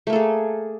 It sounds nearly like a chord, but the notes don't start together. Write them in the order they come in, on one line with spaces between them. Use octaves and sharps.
A3 A#3 A4 G#4